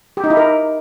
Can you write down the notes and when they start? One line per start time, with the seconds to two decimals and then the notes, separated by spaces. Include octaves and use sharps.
0.17 G4
0.24 D#4
0.30 E4
0.37 A#4